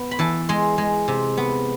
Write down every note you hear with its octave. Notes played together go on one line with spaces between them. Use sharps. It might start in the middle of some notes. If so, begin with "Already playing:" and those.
Already playing: B3
B5
E3 A5
G#3 C6
G#3
C3
B3